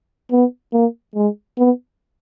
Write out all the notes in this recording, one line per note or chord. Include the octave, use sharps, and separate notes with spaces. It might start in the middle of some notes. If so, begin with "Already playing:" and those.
B3
A#3
G#3
B3